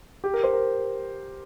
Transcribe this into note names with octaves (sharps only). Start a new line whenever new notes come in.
G4
A#4
C5
A#4